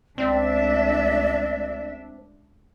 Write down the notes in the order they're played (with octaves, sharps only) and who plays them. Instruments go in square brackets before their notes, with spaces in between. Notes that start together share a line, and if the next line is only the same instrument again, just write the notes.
[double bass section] C#2 A3 [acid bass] C4 [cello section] D4 E5 [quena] D5